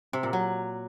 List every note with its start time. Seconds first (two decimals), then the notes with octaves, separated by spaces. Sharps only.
0.13 C3
0.23 A#2
0.33 F#3